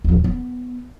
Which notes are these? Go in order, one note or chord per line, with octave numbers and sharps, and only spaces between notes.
D#1 F3
B3